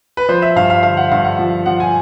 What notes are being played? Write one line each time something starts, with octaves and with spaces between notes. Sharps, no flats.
B4
F3 C5
E5
G2 F5
F5
D3 F5
F#5
G2 F5
F#5
F3
F3 F#5
G#5